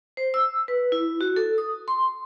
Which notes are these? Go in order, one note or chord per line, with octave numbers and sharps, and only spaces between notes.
C5
E6
B4
E4
F#4
A4
D#6
C6